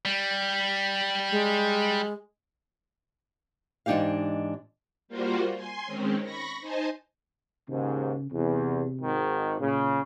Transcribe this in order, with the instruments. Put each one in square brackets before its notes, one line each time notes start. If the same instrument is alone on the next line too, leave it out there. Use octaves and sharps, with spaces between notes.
[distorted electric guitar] G3
[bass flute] G#3
[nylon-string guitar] G#2 E3 D4 D#4 G4 F5
[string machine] G3 A#3 F4 F#4 C5
G#5 C6
D#3 G#3 C4 C#4
B5 C#6 A#6
D#4 C5 D#5 G#5 A5
[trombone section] D#2 G#2 [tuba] C#3
[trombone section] E2 [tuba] C3
[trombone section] G#1 G#2 D#3
[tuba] A#2 [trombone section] C#3